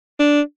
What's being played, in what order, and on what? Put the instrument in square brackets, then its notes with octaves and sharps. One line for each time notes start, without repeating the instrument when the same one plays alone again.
[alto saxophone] D4